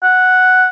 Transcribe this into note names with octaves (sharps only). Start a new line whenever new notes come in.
F#5